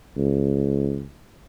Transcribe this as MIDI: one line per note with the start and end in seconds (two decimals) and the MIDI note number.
0.17 1.04 37